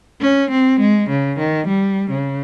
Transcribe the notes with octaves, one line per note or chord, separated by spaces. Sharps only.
C#4
C4
G#3
C#3
D#3
G3
C#3